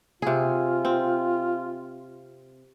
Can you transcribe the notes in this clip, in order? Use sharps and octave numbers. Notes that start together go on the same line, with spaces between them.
C3 F4 G#4
C4